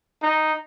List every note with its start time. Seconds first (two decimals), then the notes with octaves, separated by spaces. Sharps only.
0.23 D#4